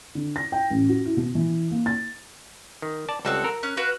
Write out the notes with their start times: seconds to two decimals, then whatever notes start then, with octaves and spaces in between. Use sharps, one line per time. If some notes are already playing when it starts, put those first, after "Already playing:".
0.15 D3
0.36 A#6
0.52 G5
0.70 A1
0.89 F#4
1.06 E4
1.17 B2
1.35 E3
1.71 A#3
1.86 A6
2.82 D#3
3.09 D5 A5
3.25 C#2 G3 C4 F#4 A4
3.44 A#4
3.63 C#4 F#6
3.77 F#4 B4 F5